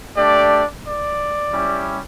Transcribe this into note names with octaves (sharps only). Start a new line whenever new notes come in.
A3 D4 G4 D5
D5
G3 C#4 E4 G4